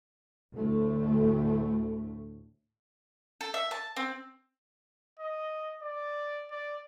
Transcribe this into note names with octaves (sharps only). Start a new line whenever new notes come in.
D2 A2 A3
A4
E5
A5
C4
D#5
D5
D5